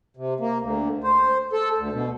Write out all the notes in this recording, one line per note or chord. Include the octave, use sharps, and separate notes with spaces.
C3
A#3
D2
C5
A4
D2
B2